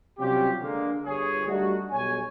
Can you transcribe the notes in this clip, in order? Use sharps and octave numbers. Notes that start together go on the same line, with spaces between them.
C3 F#3 G3 C#4 F4 G4
D3 G#3 A#3
G1 G#4 C#5
G3 A3 D4 D#4 F#4
B1 G2 C#5 G#5